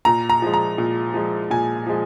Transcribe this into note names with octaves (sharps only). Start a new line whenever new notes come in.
A#2 A#5
A#5
F3 G#3
A#5
A#2
F3 G#3
A#2 G#5
F3 G#3